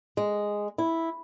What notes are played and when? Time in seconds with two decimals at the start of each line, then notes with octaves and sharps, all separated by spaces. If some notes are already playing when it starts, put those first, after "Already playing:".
0.17 G#3
0.78 E4